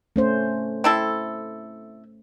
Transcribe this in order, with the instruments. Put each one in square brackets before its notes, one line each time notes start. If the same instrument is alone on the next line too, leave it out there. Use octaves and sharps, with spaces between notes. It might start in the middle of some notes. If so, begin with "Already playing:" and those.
[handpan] A3 C#4 C5
[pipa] C4 E4 A4